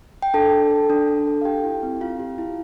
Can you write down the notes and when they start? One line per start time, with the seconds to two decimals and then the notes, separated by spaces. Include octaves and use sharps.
0.22 G5
0.34 D4 A4 A5
0.52 A4
0.71 A4
0.90 D4
1.08 D4
1.27 A4
1.41 F5
1.45 G4 G5
1.64 E4
1.83 C4
2.01 C4 F4 F5
2.19 G4
2.38 E4